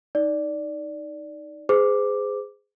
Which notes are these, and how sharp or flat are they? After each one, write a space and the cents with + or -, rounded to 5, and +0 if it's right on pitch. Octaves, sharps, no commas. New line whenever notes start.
D#4 +0 D5 -5
G#4 -5 C5 -35 D6 +0